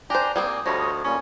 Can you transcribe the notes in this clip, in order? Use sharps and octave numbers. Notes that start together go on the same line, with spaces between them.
D4 G4 C5 G5 G#5 A#5
G3 A#3 C4 G#5 D#6
D2 F3 G3 C#5 D#5
A#2 G3 C#4